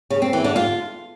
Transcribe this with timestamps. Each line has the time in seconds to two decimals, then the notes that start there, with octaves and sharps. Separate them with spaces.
0.10 C#3
0.22 C4
0.33 E3
0.44 D3
0.56 F4